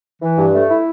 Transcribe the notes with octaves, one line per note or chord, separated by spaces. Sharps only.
E3
G2
A3
E4